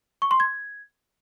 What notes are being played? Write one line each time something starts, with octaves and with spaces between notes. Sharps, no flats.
C#6
C6
G#6